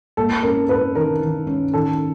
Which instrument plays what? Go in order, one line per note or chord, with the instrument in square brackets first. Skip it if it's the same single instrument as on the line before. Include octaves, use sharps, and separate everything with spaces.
[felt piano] A#3 [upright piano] A4
[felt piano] C#4 [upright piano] A#4
[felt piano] C#4 [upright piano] B4
[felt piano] D#3 [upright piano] A#4
[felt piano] D#3
C#4
[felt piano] D#3 [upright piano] A4